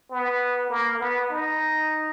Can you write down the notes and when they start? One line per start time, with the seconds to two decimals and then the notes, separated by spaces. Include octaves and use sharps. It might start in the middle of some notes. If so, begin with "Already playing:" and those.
0.11 B3
0.70 A#3
1.00 B3
1.30 D#4